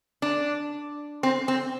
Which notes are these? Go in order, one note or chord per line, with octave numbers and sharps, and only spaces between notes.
D4
C4
C4